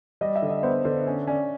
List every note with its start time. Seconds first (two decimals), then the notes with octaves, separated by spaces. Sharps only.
0.21 G3 D#5
0.36 E5
0.42 D3
0.49 D#5
0.63 B3 C5
0.85 D3 C5
1.07 C#4
1.27 C#4 D5